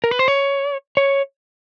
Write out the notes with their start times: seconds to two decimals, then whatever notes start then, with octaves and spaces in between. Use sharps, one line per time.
0.04 A#4
0.11 B4
0.19 C5
0.28 C#5
0.97 C#5